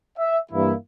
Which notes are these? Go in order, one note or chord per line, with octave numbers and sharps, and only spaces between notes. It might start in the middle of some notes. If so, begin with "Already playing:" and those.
E5
G2 E3 A#3 E4